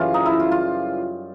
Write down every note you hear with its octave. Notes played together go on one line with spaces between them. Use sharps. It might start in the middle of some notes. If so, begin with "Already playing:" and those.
Already playing: F#2 C#3 E3 G3 F4
D#4
E4
F4
F4